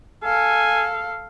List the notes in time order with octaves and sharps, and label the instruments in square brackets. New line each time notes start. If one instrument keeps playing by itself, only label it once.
[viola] A4 F5 [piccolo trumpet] G#5